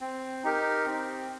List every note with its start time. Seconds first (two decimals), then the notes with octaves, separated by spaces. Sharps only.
0.01 C4
0.44 D#4 G4 A#4
0.86 C4